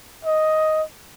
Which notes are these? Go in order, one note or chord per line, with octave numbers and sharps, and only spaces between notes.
D#5